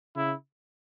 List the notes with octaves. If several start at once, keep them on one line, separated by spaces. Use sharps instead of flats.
C#3 E4